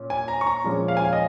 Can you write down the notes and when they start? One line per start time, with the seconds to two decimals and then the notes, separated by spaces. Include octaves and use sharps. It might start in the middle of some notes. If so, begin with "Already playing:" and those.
Already playing: A#2 C#4
0.10 G#5
0.28 A#5
0.41 C#6
0.47 A#5
0.64 A#2 F3 G#3 C#4
0.88 F5
0.97 G#5
1.04 F5
1.13 D#5